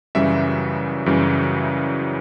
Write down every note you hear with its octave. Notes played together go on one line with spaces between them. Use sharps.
F#2 C#3 E3 G3 E5
F#2 C#3 E3 G3